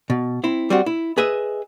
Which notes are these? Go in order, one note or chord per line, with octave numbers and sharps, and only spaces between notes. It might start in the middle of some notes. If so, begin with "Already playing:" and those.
B2
C4 E4
G3 C4 F#4
E4
G#4 B4 D#5 E5